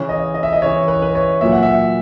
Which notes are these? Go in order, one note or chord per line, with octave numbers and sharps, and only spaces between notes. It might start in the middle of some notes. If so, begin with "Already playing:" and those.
Already playing: C#3 E3 C#5
D#5
D#5
E5
D#5
C#3 E3 C#5
B4
B4
C#5
A#2 F#3 E5
F#5
E5